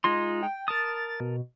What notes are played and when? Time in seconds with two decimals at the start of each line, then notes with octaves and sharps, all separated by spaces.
0.04 G#3 D#4 F4 C6
0.43 G5
0.68 A#4 A5 D#6 A6
1.20 B2